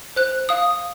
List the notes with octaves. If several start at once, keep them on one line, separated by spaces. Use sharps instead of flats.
C5 F#6
F5 D#6